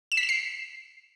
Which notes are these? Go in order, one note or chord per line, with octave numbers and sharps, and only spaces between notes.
E7
B6
E7
C7